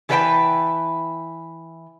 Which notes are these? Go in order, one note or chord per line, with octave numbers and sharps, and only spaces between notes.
E3 A4 B4 C#5 G5 A5